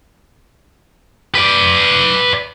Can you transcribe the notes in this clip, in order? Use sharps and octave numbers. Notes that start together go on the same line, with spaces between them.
B4 D5